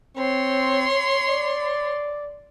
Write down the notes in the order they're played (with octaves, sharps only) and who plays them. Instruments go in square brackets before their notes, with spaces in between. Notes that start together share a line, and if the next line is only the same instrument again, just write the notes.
[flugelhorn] C4 [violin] C#5 C6
[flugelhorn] D5